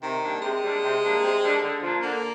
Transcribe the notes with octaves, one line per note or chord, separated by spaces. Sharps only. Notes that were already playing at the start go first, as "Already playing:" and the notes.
C3 D#3
G3 A#3 D4
C3 G#3
G3 A#3 D4
C3
G3 A#3 D4
C3
G3 A#3 D4
D3
F3 A#3 D4
D3 A#3